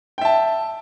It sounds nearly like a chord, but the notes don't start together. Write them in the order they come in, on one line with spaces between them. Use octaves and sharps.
G5 E5 A5